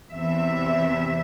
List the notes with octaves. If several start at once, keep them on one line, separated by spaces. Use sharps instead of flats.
E2 C3 E3 E5